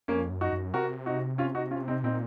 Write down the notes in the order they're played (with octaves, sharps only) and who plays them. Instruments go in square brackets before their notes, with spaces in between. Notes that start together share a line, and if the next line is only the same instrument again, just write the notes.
[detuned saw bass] F2 [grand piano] A#3 C#4
[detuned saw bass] F#2
[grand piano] D#4 F#4
[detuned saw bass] F#2
[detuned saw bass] C3 [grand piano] F#4 A#4
[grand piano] D#4 F#4
C#4 F4
D#4 F#4
C#4 F4
C4 D#4
[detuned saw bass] A#2 [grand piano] C4 D#4